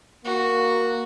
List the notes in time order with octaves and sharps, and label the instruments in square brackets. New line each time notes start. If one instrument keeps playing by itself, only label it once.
[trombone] A#3 [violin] F#4